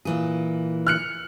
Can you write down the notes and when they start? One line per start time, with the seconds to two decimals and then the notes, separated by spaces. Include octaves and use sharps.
0.05 A#2 E3 G#4
0.87 F6 F#6 C#7